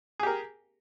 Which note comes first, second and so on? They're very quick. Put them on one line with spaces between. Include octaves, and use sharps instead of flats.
G#4 G4 A#4